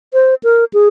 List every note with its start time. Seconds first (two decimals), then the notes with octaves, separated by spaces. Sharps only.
0.14 C5
0.44 A#4
0.73 G#4